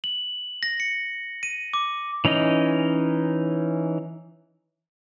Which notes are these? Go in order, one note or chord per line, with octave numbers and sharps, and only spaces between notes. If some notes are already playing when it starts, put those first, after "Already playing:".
F#7
A#6
C#7
D#7
D6
E3 C#4 D#4 D#5